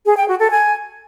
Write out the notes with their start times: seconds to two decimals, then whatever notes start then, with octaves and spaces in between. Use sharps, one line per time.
0.06 G#4
0.17 G5
0.28 F#4
0.40 A4
0.51 G#5